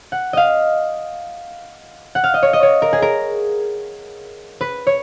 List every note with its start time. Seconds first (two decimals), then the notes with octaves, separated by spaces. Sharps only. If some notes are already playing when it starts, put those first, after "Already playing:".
0.12 F#5
0.33 D#5 F5
2.15 F#5
2.24 F5
2.34 D#5
2.43 C#5
2.53 D#5
2.63 C#5
2.82 A#4
2.93 G#4
3.02 A#4
4.61 B4
4.87 C#5